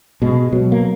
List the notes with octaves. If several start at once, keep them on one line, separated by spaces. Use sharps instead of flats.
B2 G#3
B2 F#3
A#3